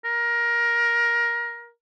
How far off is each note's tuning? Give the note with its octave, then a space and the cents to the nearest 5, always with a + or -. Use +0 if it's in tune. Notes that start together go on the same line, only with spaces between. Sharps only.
A#4 +20